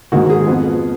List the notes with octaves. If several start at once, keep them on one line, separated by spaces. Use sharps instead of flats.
G#2 D#3 A#3 F#4
G#4
F2 F3 B3